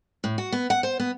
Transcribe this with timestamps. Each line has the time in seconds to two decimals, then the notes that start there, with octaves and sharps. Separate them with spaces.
0.24 A2
0.38 F#4
0.52 B3
0.70 F#5
0.83 C5
1.00 B3